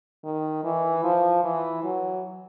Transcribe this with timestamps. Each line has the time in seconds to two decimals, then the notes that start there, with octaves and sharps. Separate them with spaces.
0.24 D#3
0.64 E3
1.04 F3
1.44 E3
1.84 F#3